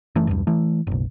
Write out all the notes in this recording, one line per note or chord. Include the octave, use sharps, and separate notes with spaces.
F#1 E3 A3 C#4
B1 E2 G2
E3 A3
F#1 B1